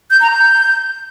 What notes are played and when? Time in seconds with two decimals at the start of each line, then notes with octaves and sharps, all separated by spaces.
0.10 G6
0.20 A#5
0.30 G6